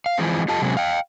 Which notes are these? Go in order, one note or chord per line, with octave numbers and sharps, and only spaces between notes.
F5
E3 F3 G#3 C4
F4 G4 A4 D#5 A5
C3 F#3 G#3 C4 C#4
F5 G5